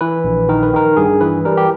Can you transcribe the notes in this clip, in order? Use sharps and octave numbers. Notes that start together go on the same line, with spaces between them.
E3 B4
A#1
D#3 A#4
B4
D#3 A#4
G2 G#4
E3 B4
G3 A#4
G4